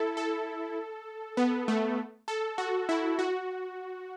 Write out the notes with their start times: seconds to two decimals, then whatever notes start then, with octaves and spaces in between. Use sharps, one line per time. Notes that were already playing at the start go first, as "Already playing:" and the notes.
Already playing: E4 A4
0.17 A4
1.37 B3
1.68 A3
2.28 A4
2.58 F#4
2.89 E4
3.19 F#4